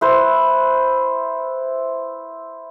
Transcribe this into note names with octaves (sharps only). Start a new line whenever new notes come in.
E4 B4 C5